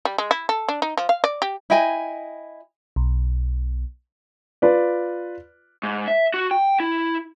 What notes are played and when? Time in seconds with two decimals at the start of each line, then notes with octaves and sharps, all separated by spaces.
0.05 G3
0.18 G#3
0.31 E4
0.49 A4
0.69 D4
0.82 D#4
0.97 F3
1.09 F5
1.24 D5
1.42 G4
1.70 E4 D#5 G5 G#5
2.96 B1
4.62 F4 B4 D5
5.83 G#2
6.08 E5
6.34 F#4
6.51 G5
6.80 E4